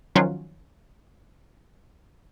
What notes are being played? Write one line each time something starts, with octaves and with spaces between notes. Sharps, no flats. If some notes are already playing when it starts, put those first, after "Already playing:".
D#3 F3 F#3 C#4 F4 F#4